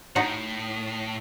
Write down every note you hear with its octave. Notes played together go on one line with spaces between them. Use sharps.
A2 D#4 F#4 F#5